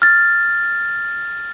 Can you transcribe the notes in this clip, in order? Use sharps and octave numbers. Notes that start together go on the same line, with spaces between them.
F6 A6